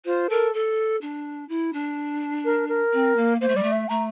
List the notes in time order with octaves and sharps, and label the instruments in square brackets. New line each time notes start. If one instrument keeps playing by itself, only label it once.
[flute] F4 [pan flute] C5
[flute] A4 [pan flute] A#4
[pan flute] A4
D4
E4
D4
[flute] A#4
A#4
[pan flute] C4
A#3
[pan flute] A#3 [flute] C5
[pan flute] A3
[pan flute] G3 [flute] D5
[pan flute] A3
[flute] E5
[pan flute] A3 [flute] A#5